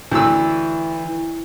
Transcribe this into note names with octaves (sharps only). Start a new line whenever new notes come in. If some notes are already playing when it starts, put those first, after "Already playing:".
D2 E3 E6